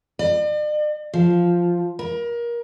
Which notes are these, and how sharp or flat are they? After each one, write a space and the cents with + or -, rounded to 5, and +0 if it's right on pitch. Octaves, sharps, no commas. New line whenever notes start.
D5 +45
F3 +0
A#4 +25